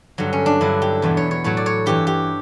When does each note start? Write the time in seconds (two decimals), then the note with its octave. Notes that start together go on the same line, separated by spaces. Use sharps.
0.18 G2 D3 F#3
0.33 C#4
0.46 D4
0.61 G2 D3 F#3 E4
0.82 G4
1.02 E2 B2 F#3
1.17 C#5
1.31 C#5
1.44 A2 F#3 C#5
1.57 D5
1.66 C#5
1.86 G2 E3 G4
2.07 G4